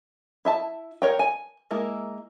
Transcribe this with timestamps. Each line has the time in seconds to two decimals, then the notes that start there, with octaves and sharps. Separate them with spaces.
0.45 E4 E5 A5
1.02 A#4 C#5 G5
1.19 G#5
1.71 G#3 A#3 E4 A#4